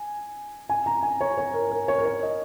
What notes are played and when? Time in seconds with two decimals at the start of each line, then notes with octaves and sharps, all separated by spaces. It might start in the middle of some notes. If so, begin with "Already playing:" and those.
Already playing: G#5
0.69 G#5
0.86 A#5
1.03 G#5
1.21 C#5
1.38 C#5
1.54 A#4
1.71 A#4
1.88 C#5
1.98 A#4
2.05 C#5
2.23 D#5